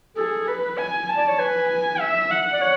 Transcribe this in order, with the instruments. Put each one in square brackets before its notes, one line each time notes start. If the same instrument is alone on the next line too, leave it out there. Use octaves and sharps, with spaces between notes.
[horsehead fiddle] G#4 [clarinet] A4
[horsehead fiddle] B4
G#5
A5
[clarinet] D5
C#5
[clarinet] B4 [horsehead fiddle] G#5
[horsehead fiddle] G#5
E5
F#5
[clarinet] D5
C#5